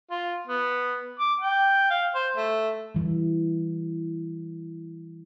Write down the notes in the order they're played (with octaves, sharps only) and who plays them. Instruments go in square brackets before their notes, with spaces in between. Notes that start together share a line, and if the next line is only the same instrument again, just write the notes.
[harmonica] F4
B3
D6
G5
F5
C5
A3
[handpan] E3 G3